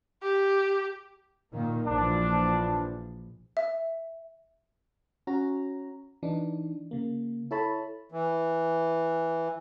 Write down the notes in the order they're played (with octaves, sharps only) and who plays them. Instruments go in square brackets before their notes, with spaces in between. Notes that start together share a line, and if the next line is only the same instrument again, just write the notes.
[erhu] G4
[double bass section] A#2 D#3 A#3
[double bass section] A#1 E3 F3 [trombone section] D4
[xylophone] E5
[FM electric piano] C#4 F#4 A#5
E3 D4 D#4
C#3 A#3
E4 A4 C#5 A5 B5
[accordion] E3